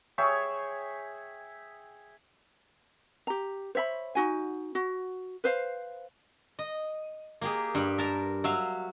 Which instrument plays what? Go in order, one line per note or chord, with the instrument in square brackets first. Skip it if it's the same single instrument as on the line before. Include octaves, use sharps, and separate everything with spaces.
[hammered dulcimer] G#4 C#5 E5 G5
[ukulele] G4 A#5
C5 C#5 E5 B5
D#4 F#4 G#5
F#4
B4 C5 F5
[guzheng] D#5
A#3 G4 G#4
G2 G4 B5
A#4 A5 A#5
F#3 E5 F5